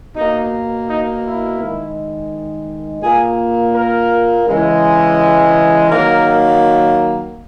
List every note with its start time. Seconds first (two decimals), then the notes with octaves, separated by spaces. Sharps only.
0.16 B2 A#3 D#4
0.88 D#4
1.24 E4
1.60 D#3 G#3
3.03 A#2 A#3 G#4
3.74 A#4
4.46 C#3 E3 G#3
5.18 G#4
5.89 D#3 F#3 A#3 A#4